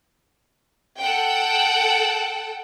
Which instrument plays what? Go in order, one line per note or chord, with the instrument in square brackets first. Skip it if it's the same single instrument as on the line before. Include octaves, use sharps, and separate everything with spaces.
[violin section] A4 F#5 G5